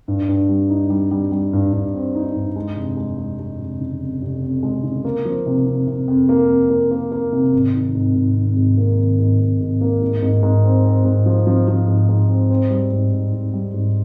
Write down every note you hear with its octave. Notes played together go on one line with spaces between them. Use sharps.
G2
G2
G3
D#4
G3
G3
G3
G2
G2
C4
D#4
G2
G#3
F1
G#3
G#3
G#3
F1
C#3
F2
F1
F2
G#3
C#3
A#3
F3
C3
C3
C3
F2
A#3
F2
A#3
A#3
A#3
C3
G#1
D#3
G#2
G#2
G#1
G#2
A#3
D#3
G#2
G#2
G#2
A#3
G#2
G#2
G#2
C4
C4
G#2
F3
F3
F3
G#2
G#2
C4
C4
G3
G#2
G#2
G#2
G3
G#2